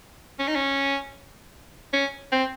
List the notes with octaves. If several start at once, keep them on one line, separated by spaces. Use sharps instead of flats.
C#4
D#4
C#4
C#4
C4